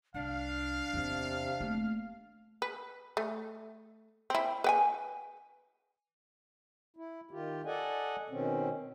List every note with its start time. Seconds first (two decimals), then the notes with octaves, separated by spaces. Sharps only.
0.14 C2 D4 F5
0.93 E2 C3 E3
1.60 A3 A#3
2.62 B4
3.17 A3
4.30 C4 E4
4.64 B4 G5 G#5
6.97 E4
7.31 D#3 F4 G4
7.66 A4 D5 D#5 F#5 G#5
8.30 B2 D#3 C4 C#4